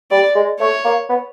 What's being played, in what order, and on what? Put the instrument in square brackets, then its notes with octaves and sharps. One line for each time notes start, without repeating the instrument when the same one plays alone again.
[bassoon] G3 [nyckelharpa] D5
[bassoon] G#3
[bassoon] A3 [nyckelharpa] C#5
[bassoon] A#3
B3